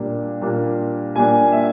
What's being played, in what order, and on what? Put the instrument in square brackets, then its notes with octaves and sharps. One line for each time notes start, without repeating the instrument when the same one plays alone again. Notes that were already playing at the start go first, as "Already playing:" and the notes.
Already playing: [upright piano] A#2 G3 A#3 D4
A#2 G3 A#3 D4
A#2 G3 A#3 D4 G#5
E5